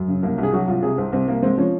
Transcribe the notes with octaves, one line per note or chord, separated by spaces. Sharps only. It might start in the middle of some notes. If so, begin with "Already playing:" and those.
Already playing: F#2
C#3
C2 A#3
C2
G#4
F#3 F#4
C2 F4
C3 G#4
C2 C4
C2 C4
C2 A#3
G#3 C4
F3 C#4